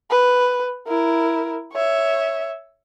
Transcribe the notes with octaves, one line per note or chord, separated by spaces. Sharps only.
B4
E4 A#4
C#5 E5